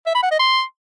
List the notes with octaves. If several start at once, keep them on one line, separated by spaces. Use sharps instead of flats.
E5
B5
F#5
D#5
C6